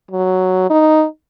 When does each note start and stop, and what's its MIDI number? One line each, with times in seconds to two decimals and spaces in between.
0.11 0.69 54
0.70 1.05 63